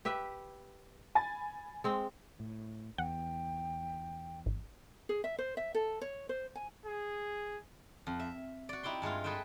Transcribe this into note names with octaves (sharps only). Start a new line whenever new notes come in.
G4 B4 E5
G#5 B5 A6
G#3 C4
A2
E2 F#5 G5
G#1
G#4
E5
C5
E5
A4
C#5
C5
G#5
G#4
F2
E5
F#4 D5
D#4 E4 G4 G5 C6
G2 G#3 D#4 F4
G#4 A4 B4 D#5 E5 G5